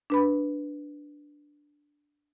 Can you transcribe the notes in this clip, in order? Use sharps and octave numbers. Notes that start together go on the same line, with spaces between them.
D4 B4 B5